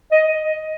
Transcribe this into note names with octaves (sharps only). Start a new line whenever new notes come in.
D#5